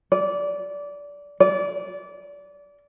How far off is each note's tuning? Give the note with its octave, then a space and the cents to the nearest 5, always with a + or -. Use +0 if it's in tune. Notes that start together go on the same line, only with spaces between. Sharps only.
D5 -20
D5 -25